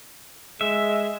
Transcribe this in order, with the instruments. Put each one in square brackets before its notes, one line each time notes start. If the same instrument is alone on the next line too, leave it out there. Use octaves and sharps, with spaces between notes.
[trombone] G#3 [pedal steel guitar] E5